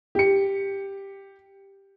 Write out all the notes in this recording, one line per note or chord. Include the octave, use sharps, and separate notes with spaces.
G4 C#7